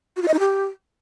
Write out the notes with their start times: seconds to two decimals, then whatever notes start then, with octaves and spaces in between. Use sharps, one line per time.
0.16 F#4
0.22 F4
0.28 D#5
0.34 D#4
0.39 G4